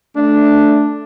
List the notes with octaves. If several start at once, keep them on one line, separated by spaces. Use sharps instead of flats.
A3 D4